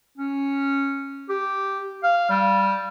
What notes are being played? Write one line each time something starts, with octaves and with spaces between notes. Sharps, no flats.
C#4
G4
F5
G3